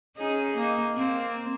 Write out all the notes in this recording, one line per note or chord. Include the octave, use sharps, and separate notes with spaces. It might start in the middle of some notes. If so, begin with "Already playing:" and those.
C#4 D#4 G#4
A#3 D#4
A#3 C4